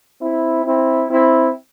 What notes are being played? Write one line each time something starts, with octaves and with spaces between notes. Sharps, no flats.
C4 E4
C4 E4
C4 E4